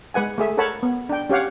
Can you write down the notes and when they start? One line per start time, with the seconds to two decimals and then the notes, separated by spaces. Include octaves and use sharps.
0.14 G#3 B4 F#5 G#5
0.38 A3 G#4 E5
0.57 A4 A#4 C#5 F#5 A5 B5
0.83 B3
1.09 D4 G5
1.29 C#4 G4 C#5 F5 F#5